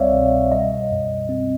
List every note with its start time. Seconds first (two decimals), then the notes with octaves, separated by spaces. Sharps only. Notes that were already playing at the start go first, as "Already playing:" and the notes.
Already playing: C2 G3 C4 C#5 D5 E5 F5
0.13 B2
0.51 G3 D#5
0.91 F#2
1.29 C4